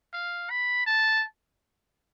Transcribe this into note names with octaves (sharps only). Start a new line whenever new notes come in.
F5
B5
A5